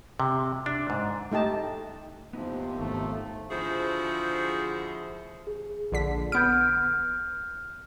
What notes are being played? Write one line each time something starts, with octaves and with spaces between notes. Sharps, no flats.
C3
D4
G#2
A3 D#4 G4 A5
D#2 C3 F3 B3 D#4 E4
G#1 D#3 A3
D3 F3 E4 F#4 G#4 C5
G#4
A#1 D3 B6
B3 F6 G6 D7